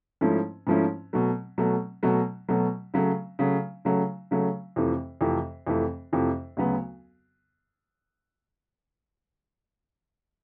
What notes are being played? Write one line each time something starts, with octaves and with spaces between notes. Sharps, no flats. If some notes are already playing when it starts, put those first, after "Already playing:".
G#2 F3 A3 C#4 E4
G#2 F3 A3 C#4 E4
B2 F#3 A3
B2 F#3 A3
B2 F#3 A3
B2 F#3 A3
C#3 F#3 A3
C#3 F#3 A3
C#3 F#3 A3
C#3 F#3 A3
F2 C3 E3 A3
F2 C3 E3 A3
F2 C3 E3 A3
F2 C3 E3 A3
D2 C#3 F#3 B3